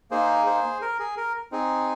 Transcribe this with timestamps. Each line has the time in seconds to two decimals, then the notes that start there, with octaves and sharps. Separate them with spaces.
0.11 A#3 D#4 G#4 C5
0.46 G#4 C5
0.82 A#4
0.99 G#4
1.17 A#4
1.52 C4 D#4 G#4